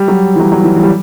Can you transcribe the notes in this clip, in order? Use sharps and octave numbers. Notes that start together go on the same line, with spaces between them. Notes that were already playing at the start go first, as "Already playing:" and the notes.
Already playing: G3
F#3
E3
F#3
F#3
E3
E3
G3